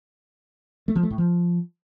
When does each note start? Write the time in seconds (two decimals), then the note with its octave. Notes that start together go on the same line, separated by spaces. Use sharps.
0.88 A3
0.96 F3
1.03 A3
1.11 A2
1.18 F3